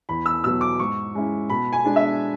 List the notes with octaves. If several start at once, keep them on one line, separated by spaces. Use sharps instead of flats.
E2 B5
E6
B2 F#3 B3 E6
D6
G#2 C#6
G#3 C#4 E4
B2 B5
G#5
G#3 D4
E5